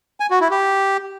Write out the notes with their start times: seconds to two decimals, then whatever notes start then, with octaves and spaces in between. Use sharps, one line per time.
0.20 G#5
0.30 F#4
0.41 E4
0.51 G4